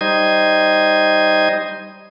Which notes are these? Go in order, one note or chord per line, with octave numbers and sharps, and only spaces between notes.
G3 D#4 C5 D#5 G#6